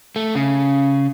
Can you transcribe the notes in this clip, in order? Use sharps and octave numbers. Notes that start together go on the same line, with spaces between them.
A3
C#3